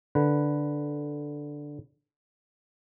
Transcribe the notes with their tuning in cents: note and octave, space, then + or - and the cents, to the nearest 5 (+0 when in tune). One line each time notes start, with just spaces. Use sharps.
D3 +0 B4 +0